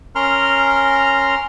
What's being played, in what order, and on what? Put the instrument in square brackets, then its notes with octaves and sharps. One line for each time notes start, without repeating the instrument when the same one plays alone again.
[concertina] C#4 A#4 A#5 C6 F6